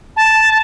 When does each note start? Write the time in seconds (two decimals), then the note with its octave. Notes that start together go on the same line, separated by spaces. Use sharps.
0.16 A5